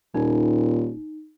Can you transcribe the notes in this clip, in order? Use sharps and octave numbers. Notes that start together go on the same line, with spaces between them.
D#1 A#2 D#4